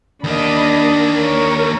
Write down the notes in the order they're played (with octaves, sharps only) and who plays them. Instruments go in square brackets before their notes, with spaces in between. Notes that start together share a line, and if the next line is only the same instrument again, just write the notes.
[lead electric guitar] D#2 A#3 [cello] D4 [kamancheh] D#5 B5
[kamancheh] A#4 C#5